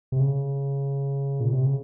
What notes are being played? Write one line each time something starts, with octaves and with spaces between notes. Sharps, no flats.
C3
C#3
A#2
C3
C#3